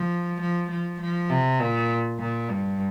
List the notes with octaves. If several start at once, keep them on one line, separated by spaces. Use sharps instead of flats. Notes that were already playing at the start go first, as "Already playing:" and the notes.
Already playing: F3
F3
F3
F3
C3
A#2
A#2
G2